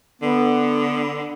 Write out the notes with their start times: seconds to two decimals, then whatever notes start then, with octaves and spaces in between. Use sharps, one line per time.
0.22 D3 B3